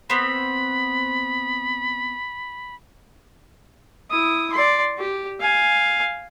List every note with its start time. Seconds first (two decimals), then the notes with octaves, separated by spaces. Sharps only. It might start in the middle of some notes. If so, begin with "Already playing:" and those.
0.10 B3 C4 B5
4.10 E4 D#6
4.52 D5 C6
4.98 G4
5.40 F5 G#5